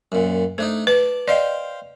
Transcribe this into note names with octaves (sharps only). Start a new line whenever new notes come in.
F#2 A#2
A3 D4 D#4 C5
B4 D5 A5
C5 D5 D#5 F5 G5